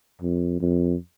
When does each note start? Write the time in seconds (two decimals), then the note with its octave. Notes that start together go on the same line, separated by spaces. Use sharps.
0.22 F2
0.61 F2